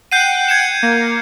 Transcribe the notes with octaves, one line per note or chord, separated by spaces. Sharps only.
F#5 G5 G6 C7 D#7
G#6 C#7 E7
A#3